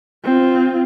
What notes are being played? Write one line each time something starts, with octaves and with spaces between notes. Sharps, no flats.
C4 F4